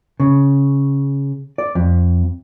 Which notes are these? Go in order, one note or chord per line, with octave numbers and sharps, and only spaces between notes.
C#3
D5
F2